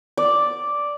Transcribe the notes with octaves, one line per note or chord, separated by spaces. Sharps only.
D5